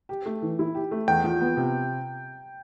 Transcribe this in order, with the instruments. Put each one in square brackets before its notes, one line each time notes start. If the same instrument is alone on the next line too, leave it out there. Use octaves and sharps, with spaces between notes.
[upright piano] G4
A3
E3
E4
G4
A3
[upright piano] E2 [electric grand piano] G5
[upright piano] F3
B3
C3